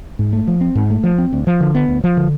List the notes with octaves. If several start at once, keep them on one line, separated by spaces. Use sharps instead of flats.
G#2
A3
F3
C4
G#2
A3
F3
C4
D2
F3
D3
B3
D2
F3
D3